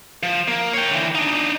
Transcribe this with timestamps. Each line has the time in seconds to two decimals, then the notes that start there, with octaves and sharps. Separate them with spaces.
0.23 F3
0.48 A#3
0.73 C#5 G5
0.91 D3 E3
1.15 D4 D#4